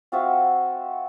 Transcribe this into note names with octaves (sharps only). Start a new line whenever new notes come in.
C4 F4 F#4 E5